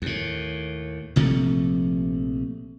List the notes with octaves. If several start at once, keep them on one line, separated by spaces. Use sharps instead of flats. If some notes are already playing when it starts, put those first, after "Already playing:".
D#2 A2
A#1 C3 F3 A3